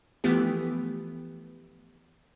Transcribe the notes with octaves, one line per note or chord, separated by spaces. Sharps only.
E3 F3 A3 B3 G4